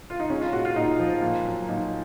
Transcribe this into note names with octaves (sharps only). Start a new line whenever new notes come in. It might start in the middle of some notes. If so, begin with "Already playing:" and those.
F4
D#4
G#3 C#4
F4
A#2 F#4
F4
A#2 D#4
F3
A#2
F#3
A#2 D#4